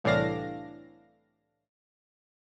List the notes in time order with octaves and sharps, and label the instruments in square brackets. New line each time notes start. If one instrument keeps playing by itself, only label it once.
[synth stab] C2 A2 E3 D4 F5 A#6